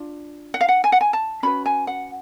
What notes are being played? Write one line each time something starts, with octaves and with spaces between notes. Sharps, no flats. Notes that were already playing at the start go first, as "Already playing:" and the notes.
Already playing: D4 F4
F#5
F5
F#5
G#5
F#5
G#5
A5
C#4 F#4 B4 B5
G#5
F#5